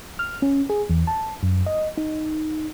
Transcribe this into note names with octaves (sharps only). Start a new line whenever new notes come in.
F6
C#4
G#4
E2
A5
F#2
D#5
D#4